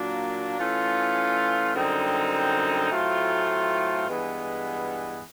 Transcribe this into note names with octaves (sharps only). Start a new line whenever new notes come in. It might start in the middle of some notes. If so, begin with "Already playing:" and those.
Already playing: A#2 F#3 A#3 D4
E3 A3 C#4 F4
F#2 D3 G3 C4 D#4
A2 F#3 A3 C4 F4
G2 E3 G#3 B3